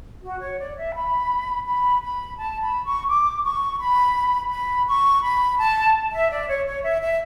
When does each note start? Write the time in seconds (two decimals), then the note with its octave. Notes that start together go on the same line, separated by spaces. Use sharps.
0.23 F#4
0.40 C#5
0.58 D5
0.77 E5
0.95 B5
1.66 B5
2.01 B5
2.37 A5
2.60 B5
2.84 C#6
3.08 D6
3.44 C#6
3.80 B5
4.51 B5
4.87 C#6
5.22 B5
5.58 A5
6.12 E5
6.30 D5
6.47 C#5
6.66 C#5
6.82 E5
7.00 E5